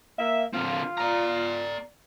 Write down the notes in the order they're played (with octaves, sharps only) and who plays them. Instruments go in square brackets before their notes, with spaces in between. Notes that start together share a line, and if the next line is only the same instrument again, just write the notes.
[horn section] A#3 E5
[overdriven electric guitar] D3 C4 [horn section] F4
[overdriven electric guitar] D5 A#5